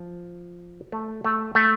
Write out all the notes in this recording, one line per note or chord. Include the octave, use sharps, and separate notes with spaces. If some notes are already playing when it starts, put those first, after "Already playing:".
Already playing: F3
A3
A3
A3